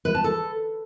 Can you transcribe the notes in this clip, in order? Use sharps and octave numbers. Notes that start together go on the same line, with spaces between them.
B4
A5
A4